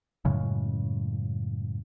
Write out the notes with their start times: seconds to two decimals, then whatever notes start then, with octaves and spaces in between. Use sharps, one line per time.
0.25 F#2 A2 C#3 G#3